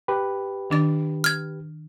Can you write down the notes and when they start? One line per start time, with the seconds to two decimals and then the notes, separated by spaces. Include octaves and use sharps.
0.08 G4 B4
0.70 D#3 D4 A6
1.24 F6 G#6